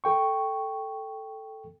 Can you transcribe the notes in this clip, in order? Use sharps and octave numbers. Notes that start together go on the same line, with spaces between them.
A4 G5 C#6